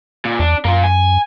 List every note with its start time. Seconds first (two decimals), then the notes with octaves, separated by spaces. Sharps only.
0.25 A#2
0.40 E2 D4
0.65 F#2 A#3 F4
0.84 G#5